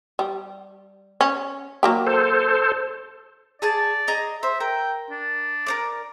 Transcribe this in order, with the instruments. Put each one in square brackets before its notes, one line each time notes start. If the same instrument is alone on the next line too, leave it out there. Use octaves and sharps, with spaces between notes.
[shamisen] G3
C#4
F#3 A#3 G4
[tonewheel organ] A4 C5
[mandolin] G#4 G#5 A5 [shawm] D5
[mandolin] G#4 D#5 A#5
[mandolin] C5 [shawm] E5
[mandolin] A#4 [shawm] G5
[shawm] D4
[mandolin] A#4 C5 D5